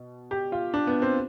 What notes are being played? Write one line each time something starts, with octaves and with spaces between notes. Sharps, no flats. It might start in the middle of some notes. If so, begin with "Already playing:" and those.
Already playing: B2
G4
F4
D4
B3
C4